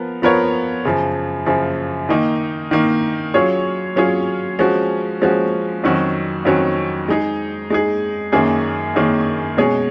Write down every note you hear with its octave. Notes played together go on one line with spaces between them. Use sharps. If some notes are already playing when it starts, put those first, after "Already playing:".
Already playing: F3 B3 A#4
F3 B3 F4 A#4 C#5
F#2 C#3 F3
F#2 C#3 F3
D#3 A#3 D#4
D#3 A#3 D#4
F#3 C#4 F4 G#4 C#5
F#3 C#4 F4 G#4 C#5
F3 G#3 C#4 F#4
F3 G#3 C#4 F#4
F2 D#3 F#3 C#4 F#4
F2 D#3 F#3 C#4 F#4
G#3 D#4 G#4
G#3 D#4 G#4
F#2 D#3 A#3 C#4 G#4
F#2 D#3 A#3 C#4 G#4
B2 G#3 C#4 G#4 C#5